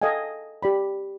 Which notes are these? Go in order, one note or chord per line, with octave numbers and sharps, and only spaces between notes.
A4 D#5 F5 G5 G#5
G4 D5 B5